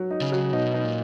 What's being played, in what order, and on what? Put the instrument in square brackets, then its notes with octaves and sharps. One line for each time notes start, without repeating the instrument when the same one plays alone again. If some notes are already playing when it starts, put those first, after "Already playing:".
Already playing: [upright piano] F#3
D#4
[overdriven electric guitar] C#3
[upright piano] F#3
[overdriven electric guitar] B2 [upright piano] D#4
[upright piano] D#4
[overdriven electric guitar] A#2